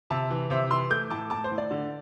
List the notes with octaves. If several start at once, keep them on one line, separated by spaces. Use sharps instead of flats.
C3 E5 A5
E3
C3 C5 E5
E3 C6 E6
A3 D6 G6
A2 A5 D6
A2 A5 D6
C5
A2
D5
D3